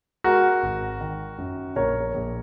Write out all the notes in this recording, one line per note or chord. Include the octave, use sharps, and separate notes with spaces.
G#3 F#4 A#4
G#1
D#3
F#2
A#1 A#4 C#5
A#1